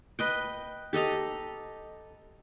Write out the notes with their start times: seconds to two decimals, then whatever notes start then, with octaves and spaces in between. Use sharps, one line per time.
0.19 B4 D#5 G5
0.93 G4 A4 D#5 A#5